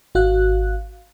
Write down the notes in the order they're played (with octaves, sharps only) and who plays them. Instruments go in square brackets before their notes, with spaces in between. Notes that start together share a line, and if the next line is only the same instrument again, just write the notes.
[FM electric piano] G#1 F#4 F5 F#6